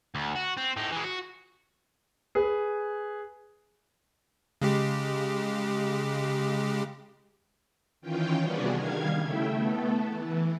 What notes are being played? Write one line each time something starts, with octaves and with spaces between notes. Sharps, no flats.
D2
F#4
C4
A2 D#4
E3 G#3
F#4
G#4 B4 G#5
C#3 G#3 G4
D#3 E3 C#4 F4 G5
C3 G3 B3 D4 F#4 G#4
D#3 G3 F5 G#6
C#3 A3 E4 E5 G5
A3 B3 A4
E3